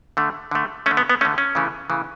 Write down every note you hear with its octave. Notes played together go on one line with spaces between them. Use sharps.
D3 A3
D3 A3
A3 C#4
D3
B3
B3
D3 A3 C#4
C#4
C#3 E3 A3
C#3 E3 A3